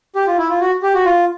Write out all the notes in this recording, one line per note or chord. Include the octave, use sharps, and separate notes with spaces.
G4
F4
E4
F4
F#4
G4
F#4
F4